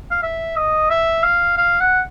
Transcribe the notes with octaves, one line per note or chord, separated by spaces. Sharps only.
F5
E5
D#5
E5
F5
F5
F#5